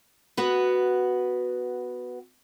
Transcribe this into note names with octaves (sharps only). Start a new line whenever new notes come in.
B3 F#4 B4